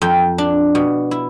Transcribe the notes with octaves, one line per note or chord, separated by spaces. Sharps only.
F2 G5
D4
B2
E4